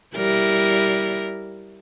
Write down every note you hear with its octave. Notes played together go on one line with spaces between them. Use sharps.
G3 E4 A#4